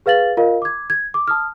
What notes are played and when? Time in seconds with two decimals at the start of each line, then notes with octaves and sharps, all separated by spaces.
0.06 G#4 B4 F5 A6 F#7
0.37 F4 A#4 D#5 F5
0.62 D6 G#6
0.90 G#6
1.14 D6
1.28 A5 D#6 F6